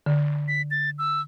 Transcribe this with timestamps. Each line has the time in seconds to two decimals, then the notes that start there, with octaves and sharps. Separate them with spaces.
0.06 D3
0.48 B6
0.71 A6
0.99 E6